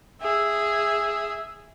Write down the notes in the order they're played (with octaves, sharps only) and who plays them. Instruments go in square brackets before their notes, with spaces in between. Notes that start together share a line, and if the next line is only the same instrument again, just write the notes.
[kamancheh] G#4 E5